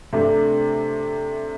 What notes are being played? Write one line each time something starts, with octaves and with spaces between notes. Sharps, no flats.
C3 A3 D4